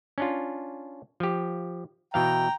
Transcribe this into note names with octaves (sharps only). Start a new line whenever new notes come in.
C#4 D4 F4
F3 G4
B2 E3 F5 G5 A#5